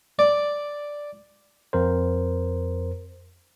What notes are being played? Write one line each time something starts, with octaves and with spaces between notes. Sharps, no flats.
D5
F2 A#4 C5